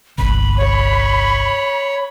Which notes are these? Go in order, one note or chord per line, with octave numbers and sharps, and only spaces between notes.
G1 C2 B5
C#5